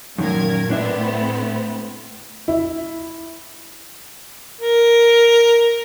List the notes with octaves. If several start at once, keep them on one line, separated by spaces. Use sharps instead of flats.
F#2 A#2 D#3 A#4 G#6
A2 A3 B3 C4 D4 E5
E4
A#4